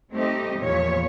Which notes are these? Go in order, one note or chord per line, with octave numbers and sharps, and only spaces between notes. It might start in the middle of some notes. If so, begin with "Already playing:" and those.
A3 C4 D#4 G4 C5 D#5
E2 A#2 F3 C#5